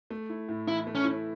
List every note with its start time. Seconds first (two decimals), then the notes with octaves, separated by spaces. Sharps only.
0.11 A3
0.29 E4
0.49 A2
0.68 E3 E4
0.87 A3
0.95 C#4
1.05 E4